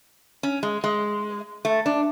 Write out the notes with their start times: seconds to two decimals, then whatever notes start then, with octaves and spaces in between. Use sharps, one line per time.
0.43 C#4
0.63 G#3
0.84 G#3
1.65 A3
1.86 D4